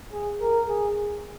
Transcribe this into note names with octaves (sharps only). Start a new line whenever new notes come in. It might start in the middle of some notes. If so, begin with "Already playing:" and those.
G#4
A#4
G#4